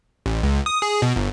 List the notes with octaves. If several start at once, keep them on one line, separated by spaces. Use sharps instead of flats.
A1
C#2
D#6
G#4
B2
G1